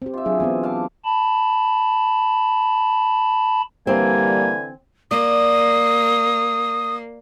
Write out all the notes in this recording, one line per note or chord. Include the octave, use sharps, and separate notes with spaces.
C4 G4
F4 E5
F#3 D4 G#4
C#3 E3 B3 C4
F5 A5 D6
A5 B5
D3 E3 G3 A#3 C4 G#5
A#3 D5 D#6